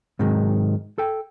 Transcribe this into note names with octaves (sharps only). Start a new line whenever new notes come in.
G#2 C3 D#3 F#3 G#3
A4 G5